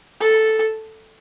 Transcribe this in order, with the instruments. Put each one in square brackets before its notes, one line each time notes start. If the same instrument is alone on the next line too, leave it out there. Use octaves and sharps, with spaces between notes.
[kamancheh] A4